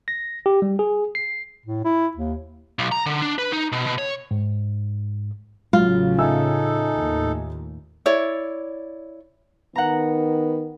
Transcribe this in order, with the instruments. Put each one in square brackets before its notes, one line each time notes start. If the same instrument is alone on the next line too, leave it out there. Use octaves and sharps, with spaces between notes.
[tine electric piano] A#6
G4
G3
G#4
C7
[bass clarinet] A2
E4
D#2
[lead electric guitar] B1
A#5
D3
D4
B4
D#4
B2
B2
C#5
[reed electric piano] G#2
[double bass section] A1 A2 C#3 [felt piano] F#3 [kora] F4
[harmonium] D#4 A4 [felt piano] E5 G#5 E6
[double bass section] D#2 A2
[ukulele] E4 C#5 D5
[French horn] D#3 [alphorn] B3 [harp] F#5 A#5